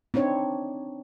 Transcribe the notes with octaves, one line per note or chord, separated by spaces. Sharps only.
C4 D4 D#4 C#5